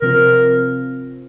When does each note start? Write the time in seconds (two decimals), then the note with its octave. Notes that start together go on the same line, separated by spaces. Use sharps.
0.02 C3 F3 C4 F4 A#4